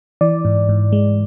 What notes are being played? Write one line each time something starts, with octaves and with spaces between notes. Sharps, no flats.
E3 D5
G#2
G#2
G#3